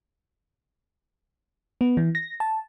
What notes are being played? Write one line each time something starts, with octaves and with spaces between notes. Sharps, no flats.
B3
E3
A#6
A5